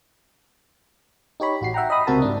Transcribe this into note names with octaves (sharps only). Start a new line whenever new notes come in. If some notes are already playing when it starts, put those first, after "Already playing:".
D#4 G4 C#5 B5
A1 F#4 C7
E5 F#5 G5 A#5
D#5 E5 B5 D#6
C#2 C3 C4 F#4 A#4 A5
G#2 D4